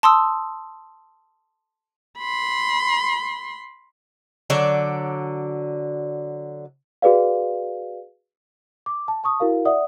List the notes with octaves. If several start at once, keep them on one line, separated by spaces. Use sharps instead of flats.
A5 C6 D#6 E6
B5 C6
D3 F#3 D5
F#4 G#4 B4 D5 F5
D6
A5
A5 C#6 D#6
E4 F#4 A#4 F5
D5 E5 F#5 D#6